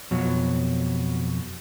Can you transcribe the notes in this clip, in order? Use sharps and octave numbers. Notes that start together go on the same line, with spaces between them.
F2 B2 F#3